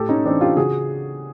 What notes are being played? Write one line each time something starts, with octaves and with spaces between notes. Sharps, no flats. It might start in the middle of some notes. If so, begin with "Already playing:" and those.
Already playing: A2 G4 A4
C#4 D#4
E3 C4 D4
F4 G4
C#3 F#4 G#4